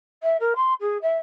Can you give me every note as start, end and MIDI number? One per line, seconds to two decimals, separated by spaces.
0.23 0.37 76
0.40 0.53 70
0.56 0.73 84
0.80 0.97 68
1.02 1.18 76